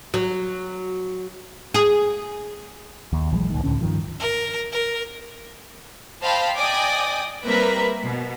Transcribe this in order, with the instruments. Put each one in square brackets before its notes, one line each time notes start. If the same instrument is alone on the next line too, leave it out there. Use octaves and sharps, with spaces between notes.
[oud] F#3
G#4
[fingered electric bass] D#2
A#1 E3 F#3 G#3
C#2 A#2 D#3
C#2 A2 D3 C#4
G2 D#3 F3
[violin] A#4
A#4
[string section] C5 D#5 F5 G5 A5 B5
D5 D#5 G5 G#5 D6 D#6
G3 A#3 C4 A#4 B4 E5
B2